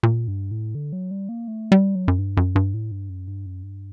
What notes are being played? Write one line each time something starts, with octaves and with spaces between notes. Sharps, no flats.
A#2
G2
A2
D3
F#3
G3
A#3
A3
G3
F#3
F#2
G2
F#2
G2
A2
G2
F#2
G2
F#2
G2